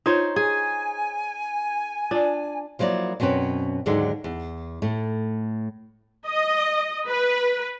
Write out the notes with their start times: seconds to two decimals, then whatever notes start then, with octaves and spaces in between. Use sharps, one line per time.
0.06 D#4 F4 C5 C#5
0.36 G#4 G#5
2.11 D4 F4 D5
2.79 F3 F#3 A#3 E4 D5
3.20 F#2 B2 C4 C#4 B4
3.86 D#2 G#2 D3 F#3 G#3
4.24 E2
4.82 A2 A3
6.29 D#5
7.08 B4